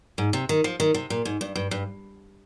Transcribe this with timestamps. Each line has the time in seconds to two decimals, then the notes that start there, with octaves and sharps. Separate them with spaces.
0.18 G#2
0.33 C3
0.49 D#3
0.64 F3
0.80 D#3
0.94 C3
1.10 A#2
1.25 G#2
1.41 G2
1.56 G2
1.71 G2